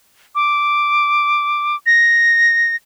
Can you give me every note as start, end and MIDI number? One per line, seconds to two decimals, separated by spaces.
0.35 1.76 86
1.86 2.76 94